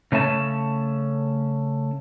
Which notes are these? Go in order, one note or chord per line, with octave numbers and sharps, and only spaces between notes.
C#3 A3 C#4 A5